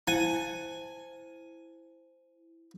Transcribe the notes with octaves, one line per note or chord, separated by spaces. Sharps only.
E4 C5 G#5